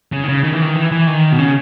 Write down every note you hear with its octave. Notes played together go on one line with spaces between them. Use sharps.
C#3
D#3
C#3
D#3
E3
D#3
E3
E3
D#3
B2
C#3